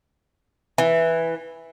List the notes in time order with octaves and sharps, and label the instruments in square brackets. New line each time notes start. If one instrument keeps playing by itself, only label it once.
[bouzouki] E3